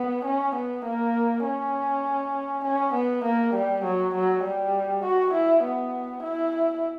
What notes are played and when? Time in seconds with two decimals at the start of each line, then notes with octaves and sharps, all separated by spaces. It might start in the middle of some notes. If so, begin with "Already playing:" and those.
Already playing: B3
0.25 C#4
0.55 B3
0.85 A#3
1.44 C#4
2.64 C#4
2.93 B3
3.24 A#3
3.53 G3
3.84 F#3
4.14 F#3
4.43 G3
5.03 F#4
5.33 E4
5.63 B3
6.23 E4